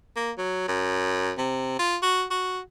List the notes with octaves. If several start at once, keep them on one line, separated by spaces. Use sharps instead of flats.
A#3
F#3
F#2
C3
F4
F#4
F#4